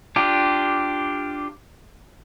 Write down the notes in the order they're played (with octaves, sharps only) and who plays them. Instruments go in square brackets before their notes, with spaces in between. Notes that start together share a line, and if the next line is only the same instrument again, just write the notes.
[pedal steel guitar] D4 F4 G4